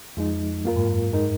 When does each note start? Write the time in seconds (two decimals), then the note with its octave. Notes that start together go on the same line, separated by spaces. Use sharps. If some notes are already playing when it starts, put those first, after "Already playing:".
0.17 F2 F3 G#3 D#4
0.65 F#2 A#3 F4 A#4
0.76 G#2
0.86 F#2
1.13 G#3 D#4 A#4